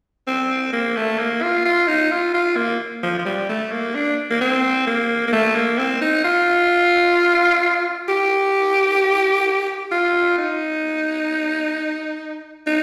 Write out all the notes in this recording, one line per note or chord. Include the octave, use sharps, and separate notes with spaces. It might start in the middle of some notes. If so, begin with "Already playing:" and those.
C4
A#3
A3
A#3
F4
F4
D#4
F4
F4
A#3
F3
F3
G3
A3
A#3
D4
A#3
C4
A#3
A#3
A3
A#3
C4
D#4
F4
G4
F4
D#4
D#4